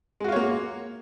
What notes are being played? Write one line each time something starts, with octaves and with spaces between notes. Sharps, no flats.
G#3 A#3 F4 F#4 C#5